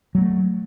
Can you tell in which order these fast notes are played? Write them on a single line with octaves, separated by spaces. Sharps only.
F#3 G#3 A3